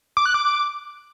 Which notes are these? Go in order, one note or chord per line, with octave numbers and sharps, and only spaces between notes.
D6
F#6
D6